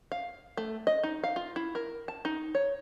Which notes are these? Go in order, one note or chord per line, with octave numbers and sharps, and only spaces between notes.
F5
A3
D#5
D#4
F5
F4
E4
A#4
A5
D#4
C#5